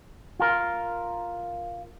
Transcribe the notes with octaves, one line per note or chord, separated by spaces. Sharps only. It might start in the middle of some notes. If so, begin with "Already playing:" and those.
F4 A#4